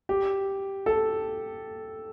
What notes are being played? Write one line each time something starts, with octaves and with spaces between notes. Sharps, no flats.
G4
A4